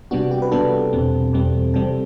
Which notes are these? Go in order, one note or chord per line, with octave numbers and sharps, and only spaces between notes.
C3 G3 B3 D4 F#4
G4
B4
C3 G3 B3 D4 A4
E2 B2 G3 C4
E2 B2 G3 C4
C3 G3 C4 A4